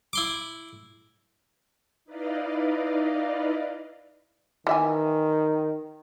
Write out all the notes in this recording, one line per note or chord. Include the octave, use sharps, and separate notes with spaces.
E4 C6 D6
D#4 E4 B4 D5 D#5 F5
D#3 E3 E5 G#5